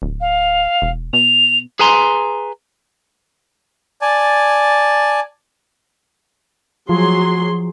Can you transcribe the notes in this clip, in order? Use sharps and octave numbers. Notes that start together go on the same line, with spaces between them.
D1
F5
E1
B2 F7
G#4 B4 G#5 A#5 C6
D5 G#5 A5
F3 F#3 G#4 C6